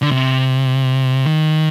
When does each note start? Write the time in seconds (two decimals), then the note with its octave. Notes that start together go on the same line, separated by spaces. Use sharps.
0.02 D3
0.11 C3
1.26 D#3